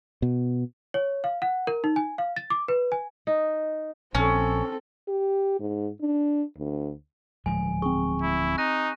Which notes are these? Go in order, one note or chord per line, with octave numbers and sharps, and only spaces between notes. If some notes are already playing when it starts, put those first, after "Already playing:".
B2
C#5
F5
F#5
A#4
D#4
G#5
F5
A6
D6
B4
G#5
D#4
A#1 C4 C#4 A4
G4
G#2
D4
D2
D1 F3 G#3 G#5
C4 G#4 C#6
E4
D#4 F#6 A#6 D#7